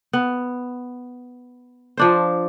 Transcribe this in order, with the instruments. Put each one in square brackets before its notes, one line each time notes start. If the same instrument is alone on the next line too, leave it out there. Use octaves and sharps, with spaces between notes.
[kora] B3
F3 D4 C5